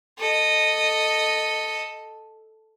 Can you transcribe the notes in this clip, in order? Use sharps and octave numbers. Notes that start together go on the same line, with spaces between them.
A4 D#5